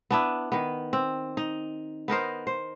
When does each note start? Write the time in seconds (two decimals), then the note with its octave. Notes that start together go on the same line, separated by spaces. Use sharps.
0.11 B3 D4 E4
0.52 D#3 B3
0.93 C4
1.37 D#4
2.08 B3 D#4 A#4 C5
2.47 C5